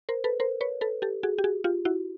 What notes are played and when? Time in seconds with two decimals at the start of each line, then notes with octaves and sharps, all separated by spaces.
0.09 A#4 C5
0.24 A4 B4
0.40 A#4 C5
0.61 B4 C#5
0.81 A4 B4
1.02 G4 A4
1.23 F#4 G#4
1.38 G4
1.44 F#4 G#4
1.64 F4 G4
1.85 E4 F#4